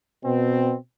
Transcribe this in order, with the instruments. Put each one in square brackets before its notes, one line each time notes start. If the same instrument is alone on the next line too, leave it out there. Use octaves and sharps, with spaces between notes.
[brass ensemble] B2 C4